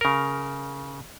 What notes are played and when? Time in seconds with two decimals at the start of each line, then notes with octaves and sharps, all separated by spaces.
0.01 C#3 A#4